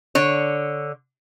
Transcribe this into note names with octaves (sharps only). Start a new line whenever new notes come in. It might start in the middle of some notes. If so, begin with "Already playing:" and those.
D3 C#5